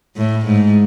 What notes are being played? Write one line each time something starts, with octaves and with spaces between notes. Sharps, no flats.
A2
G#2